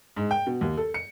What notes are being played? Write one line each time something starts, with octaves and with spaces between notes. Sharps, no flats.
G#2
G5
B2
D#2
A4
C#7